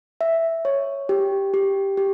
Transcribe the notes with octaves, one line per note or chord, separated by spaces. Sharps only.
E5
C#5
G4
G4
G4